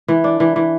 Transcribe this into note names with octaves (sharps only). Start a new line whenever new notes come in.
E3
D4
E3
E3